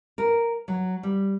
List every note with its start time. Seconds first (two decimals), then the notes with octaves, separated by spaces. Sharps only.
0.18 A#4
0.68 F#3
1.03 G3